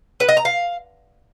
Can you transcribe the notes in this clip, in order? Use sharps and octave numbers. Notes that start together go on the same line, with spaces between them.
B4
D#5
A#5
F5